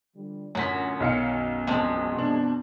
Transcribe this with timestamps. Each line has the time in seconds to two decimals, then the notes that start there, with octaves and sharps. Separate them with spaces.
0.16 D3 F3 G3
0.55 F#2 A2 D3 F#3 C#4 F4 B6
1.00 B1 D#3 F5 C#7
1.32 F#2 F#4
1.67 E2 F3 G#3 C4 A5
2.15 B2 D4